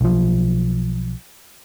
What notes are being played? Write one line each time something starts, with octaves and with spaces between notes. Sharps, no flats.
B1 F3